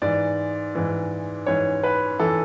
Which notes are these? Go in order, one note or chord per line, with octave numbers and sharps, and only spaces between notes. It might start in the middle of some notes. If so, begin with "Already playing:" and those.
G#2 E3 D5
G#2 E3
G#2 E3 C#5
B4
E3 A4